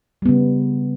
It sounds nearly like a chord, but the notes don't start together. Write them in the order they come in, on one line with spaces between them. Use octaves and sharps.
G3 B3 C#3